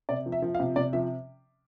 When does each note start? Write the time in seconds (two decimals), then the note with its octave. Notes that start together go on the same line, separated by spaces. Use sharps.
0.09 C3 D5
0.26 F3
0.32 E5
0.42 F3
0.55 F5
0.60 C3
0.76 C3 D5
0.93 F3 E5